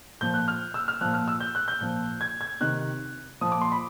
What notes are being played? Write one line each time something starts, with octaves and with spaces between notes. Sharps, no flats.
A#2 F3 G6
F#6
F6
E6
F6
A#2 F3 F#6
F6
E6
G6
F#6
G6
A#2 F3
G#6
G#6
C3 D#3 F#6
A#2 F3 D#6
D6
C6
B5